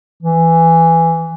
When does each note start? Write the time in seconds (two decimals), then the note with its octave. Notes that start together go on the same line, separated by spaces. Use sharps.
0.23 E3